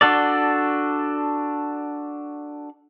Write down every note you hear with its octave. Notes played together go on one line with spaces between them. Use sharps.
D4 F#4 A4 D5